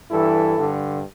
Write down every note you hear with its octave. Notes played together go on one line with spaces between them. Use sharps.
G2 E3 E4 A4
G2 D3